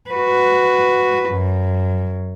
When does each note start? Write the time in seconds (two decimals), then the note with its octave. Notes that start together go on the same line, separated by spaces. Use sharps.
0.10 F#4 B4
1.30 F#2